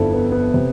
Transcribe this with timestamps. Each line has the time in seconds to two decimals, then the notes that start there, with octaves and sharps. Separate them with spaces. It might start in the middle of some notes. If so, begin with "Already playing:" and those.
Already playing: G1 F2 D3 F3 E4 A4
0.13 B3
0.32 B3
0.54 C3